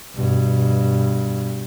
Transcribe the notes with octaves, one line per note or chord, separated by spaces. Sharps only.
G2 B2